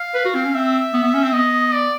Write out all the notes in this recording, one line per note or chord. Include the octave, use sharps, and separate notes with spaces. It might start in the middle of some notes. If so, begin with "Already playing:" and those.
Already playing: F5
B4
F#4
C4
C#4
C4 E5
B3
B3
C#4
C4
B3 D#5
D5